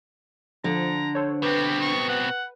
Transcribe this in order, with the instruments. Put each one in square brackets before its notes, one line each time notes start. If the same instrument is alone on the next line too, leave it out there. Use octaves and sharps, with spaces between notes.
[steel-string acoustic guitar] D3 [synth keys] F3 [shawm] A#5
[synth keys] A4 C5 C#5
[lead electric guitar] B2 C4 [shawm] G4 [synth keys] B4
[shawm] C#6
F#5